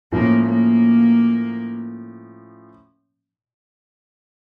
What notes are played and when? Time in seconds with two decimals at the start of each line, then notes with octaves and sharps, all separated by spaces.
0.12 A2 F3 A#3 C#4
0.45 A#3